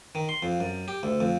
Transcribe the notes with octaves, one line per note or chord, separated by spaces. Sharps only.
D#3
C6
F2
F#2
G4
D2
F2